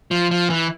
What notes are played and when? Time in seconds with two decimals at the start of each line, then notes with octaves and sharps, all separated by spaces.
0.11 F3
0.31 F3
0.50 E3